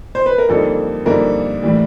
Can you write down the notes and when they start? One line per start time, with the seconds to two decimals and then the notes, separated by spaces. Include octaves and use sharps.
0.15 C5
0.26 B4
0.38 A#4
0.49 F2 D3 G3 A#3 D#4 A4
1.06 F2 D3 G3 A#3 D#4 A#4
1.63 A2 E3 G3